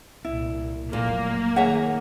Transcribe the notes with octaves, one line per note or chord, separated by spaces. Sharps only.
C2 A#2 E4
F1 F#2 A#2 A#3
D#3 G#4 C#5 E5 F#5